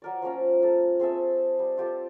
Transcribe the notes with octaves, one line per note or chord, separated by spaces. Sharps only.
F#3 A#4 D5
F3 A#3 C#4 A#5
A#3 A4
C4 G#4 A4 E5
G3
F4 G4 A4